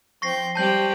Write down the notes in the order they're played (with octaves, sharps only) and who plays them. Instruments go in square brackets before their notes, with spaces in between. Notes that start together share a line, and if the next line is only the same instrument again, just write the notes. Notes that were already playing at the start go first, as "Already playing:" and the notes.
[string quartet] F3 C4 G6 [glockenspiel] C#6 A#6 C7
[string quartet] G3 C4 G4 [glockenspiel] A5 G6 F#7